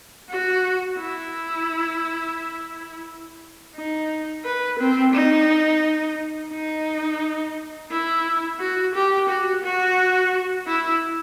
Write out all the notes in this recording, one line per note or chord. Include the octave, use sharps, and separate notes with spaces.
F#4
E4
D#4
B4
C4
D#4
D#4
E4
F#4
G4
F#4
F#4
E4